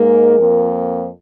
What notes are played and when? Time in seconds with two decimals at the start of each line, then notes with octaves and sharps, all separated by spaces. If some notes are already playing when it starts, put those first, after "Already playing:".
Already playing: G#2 G#3 A#3 A#4
0.37 F2 F3 A#3